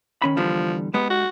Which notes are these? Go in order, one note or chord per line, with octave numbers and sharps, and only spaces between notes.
D#3 C#4 B5
E2 D3 F3 G3
G#3 B3 G4
F#4